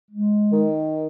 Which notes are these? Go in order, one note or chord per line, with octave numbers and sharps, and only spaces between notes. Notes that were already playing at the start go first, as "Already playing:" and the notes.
G#3
D#3